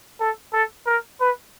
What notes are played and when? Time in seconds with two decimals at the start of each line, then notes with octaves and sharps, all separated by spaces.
0.20 A4
0.53 A4
0.87 A#4
1.20 B4